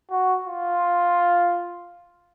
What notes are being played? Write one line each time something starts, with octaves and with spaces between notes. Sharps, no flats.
F#4
F4